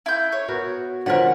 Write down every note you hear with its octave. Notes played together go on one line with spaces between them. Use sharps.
E4 G6
C#5
B3 F#4 A#4
D3 F3 C#4 A#4 B4 F#5